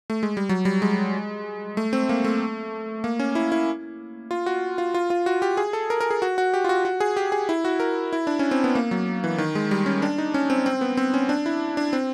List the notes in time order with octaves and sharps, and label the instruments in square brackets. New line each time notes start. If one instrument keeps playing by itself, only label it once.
[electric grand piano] A3
G#3
G3
F#3
G3
G#3
A3
C4
A#3
A3
A#3
C#4
E4
E4
F4
F#4
F4
F4
F4
F#4
G4
G#4
A4
A#4
A#4
G#4
F#4
F#4
G4
F4
F#4
F#4
G#4
G4
G#4
E4
F#4
A#4
E4
D4
C#4
C4
B3
A#3
F#3
E3
D#3
G#3
G3
C#4
D4
D#4
C#4
C4
C4
B3
C4
C#4
D4
E4
D4
C4